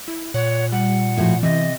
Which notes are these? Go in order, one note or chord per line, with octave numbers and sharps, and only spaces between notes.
E4
A#2 C#5 F#5
G3 F#5
A2 F3 F#4
C3 E3 D#5